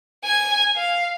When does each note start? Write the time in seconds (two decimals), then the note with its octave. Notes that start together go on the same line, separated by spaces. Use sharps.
0.23 G#5 G#6
0.75 F5